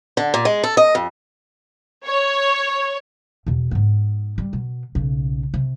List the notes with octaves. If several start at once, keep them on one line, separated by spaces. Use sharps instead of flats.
D3
A#2
G#3
A4
D#5
F2
C#5
E2 B2
G#2 B3
G3
B2
B1 C#3
C3